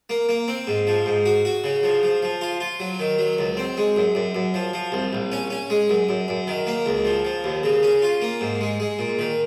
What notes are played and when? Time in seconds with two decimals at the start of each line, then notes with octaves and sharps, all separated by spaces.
0.10 A#3
0.29 A#3
0.48 C4
0.67 G#2
0.87 F3
1.06 G#2
1.26 F#4
1.45 F#4
1.64 C#3
1.83 F3
2.03 F3
2.23 F3
2.41 F4
2.60 F4
2.80 F#3
3.00 D#3
3.19 F#3
3.39 C#2
3.57 C4
3.77 G#3
3.97 F#2
4.15 F#2
4.35 F#2
4.54 F3
4.74 F3
4.92 C2
5.13 A#1
5.32 C#4
5.50 C#4
5.70 G#3
5.90 F#2
6.09 F#2
6.28 F#2
6.47 D#3
6.67 A#3
6.86 C#2
7.05 F3
7.25 F3
7.44 D#2
7.64 C#3
7.83 C#4
8.02 F4
8.22 A#3
8.41 G#2
8.61 G#3
8.80 G#3
8.99 A#2
9.19 D#3